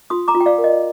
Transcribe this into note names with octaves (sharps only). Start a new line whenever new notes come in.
F4 C6 D#6
A#5 D6
F4
G5
D5 F5
A#4
D#5